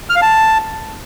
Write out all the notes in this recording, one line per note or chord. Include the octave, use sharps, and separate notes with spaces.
F6
F5
A5